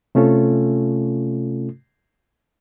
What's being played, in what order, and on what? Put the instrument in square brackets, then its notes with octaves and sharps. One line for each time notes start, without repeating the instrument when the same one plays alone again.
[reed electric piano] C3 A3 C#4 F4 A4